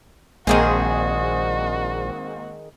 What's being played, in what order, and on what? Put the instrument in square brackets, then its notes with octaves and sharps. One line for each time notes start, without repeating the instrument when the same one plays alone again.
[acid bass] A#1 [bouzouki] D#3 G#4 C5 [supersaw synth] G#3 A#3 C4 [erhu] F#4